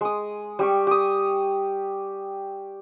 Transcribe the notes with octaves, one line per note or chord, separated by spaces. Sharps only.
G#3 D#6
G3 G4 C#6
G4 D#6